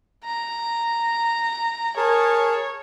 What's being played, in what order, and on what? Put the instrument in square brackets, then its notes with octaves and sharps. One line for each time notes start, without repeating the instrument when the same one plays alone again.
[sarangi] A#5
[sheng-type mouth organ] G#4 A#4 A5 [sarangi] C#5